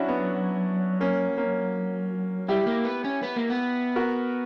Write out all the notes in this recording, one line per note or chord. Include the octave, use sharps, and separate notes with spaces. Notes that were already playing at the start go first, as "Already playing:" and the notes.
Already playing: F#3 C#4 D4 E4 F#4
B3
A#3 C#4
A#3 C#4
G3 E4 G4
A#3
B3
C#4
B3
A#3
B3
F#4 A#4